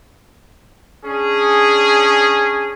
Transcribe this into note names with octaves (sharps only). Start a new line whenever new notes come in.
C#4 D4 G#4